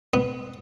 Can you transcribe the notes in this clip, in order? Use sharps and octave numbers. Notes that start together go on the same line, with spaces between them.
B3